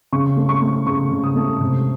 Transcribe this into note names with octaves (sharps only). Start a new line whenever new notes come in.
C#3 C#6
A3
C#6
A3
C#3 C#6
C#3
D#6
A3
C3